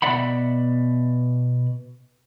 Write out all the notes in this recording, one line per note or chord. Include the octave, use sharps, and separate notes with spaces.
B2 D5 E5 F#5 B5